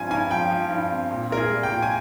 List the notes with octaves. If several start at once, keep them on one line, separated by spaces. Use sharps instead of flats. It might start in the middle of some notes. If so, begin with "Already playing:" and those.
Already playing: G2 F3 C4 G#5
G2 G#5
F3 G5
F3
G2
C4
A#2
A#2 A#4
G#4
G3
G5
A#2
G#5